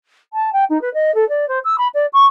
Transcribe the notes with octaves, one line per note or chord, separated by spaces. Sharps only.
A5
G5
D#4
B4
D#5
A4
D5
C5
E6
B5
D5
C#6